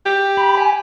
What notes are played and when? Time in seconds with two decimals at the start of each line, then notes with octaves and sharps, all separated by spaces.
0.06 G4
0.37 B5
0.57 G#5